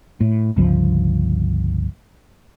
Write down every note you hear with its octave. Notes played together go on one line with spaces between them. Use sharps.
A2
G1 C#2 F3